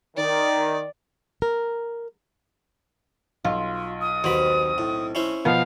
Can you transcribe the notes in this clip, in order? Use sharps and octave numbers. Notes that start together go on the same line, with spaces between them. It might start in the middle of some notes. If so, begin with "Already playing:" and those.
D#3 D5
A#4
B1 F4
D#6
D#2 B2 C4 B5
A2
C#4 E4 C5
B2 F3 B3 F5